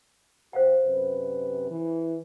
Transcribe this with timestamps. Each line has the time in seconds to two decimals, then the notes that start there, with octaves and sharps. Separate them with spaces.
0.53 G2 G4 C5 F5 F#5
0.83 F#2 C3 B4
1.70 E3